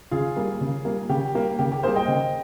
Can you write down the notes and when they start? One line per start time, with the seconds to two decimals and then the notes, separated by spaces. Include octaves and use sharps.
0.11 C#3 F4 G#4
0.36 G3 A#3
0.61 C#3
0.85 G3 A#3
1.09 C#3 G4
1.34 G3 A#3
1.59 C#3 G4
1.72 G4
1.83 G3 A#3 G#4 C5
1.96 D#5 G5
2.08 C#3